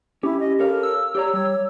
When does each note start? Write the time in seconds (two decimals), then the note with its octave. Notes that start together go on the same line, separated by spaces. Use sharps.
0.23 C#4 E4 G4
0.40 D#5
0.59 A4 A#4 C#5 F5
0.83 E6
1.15 G4 C#5 D5 A#5
1.34 G3 C#5